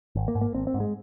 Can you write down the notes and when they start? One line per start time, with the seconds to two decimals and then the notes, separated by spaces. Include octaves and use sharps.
0.16 G#1
0.28 A#3
0.35 G#2
0.41 A#3
0.54 G#1 C4
0.67 C4
0.74 G#2
0.80 G#3